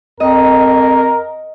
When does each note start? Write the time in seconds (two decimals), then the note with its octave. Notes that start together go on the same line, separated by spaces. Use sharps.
0.20 F2 A#4 D#5